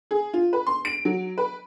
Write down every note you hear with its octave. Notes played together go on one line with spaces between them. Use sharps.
G#4
F4
B4
C6
D7
F#3
B4